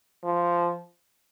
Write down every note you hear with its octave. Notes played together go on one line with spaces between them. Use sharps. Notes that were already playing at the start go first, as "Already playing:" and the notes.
F3